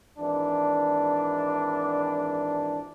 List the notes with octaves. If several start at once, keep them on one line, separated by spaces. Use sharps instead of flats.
G#1 E3 D4